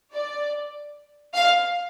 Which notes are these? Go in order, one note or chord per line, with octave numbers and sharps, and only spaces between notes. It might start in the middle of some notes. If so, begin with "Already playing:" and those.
D5
F5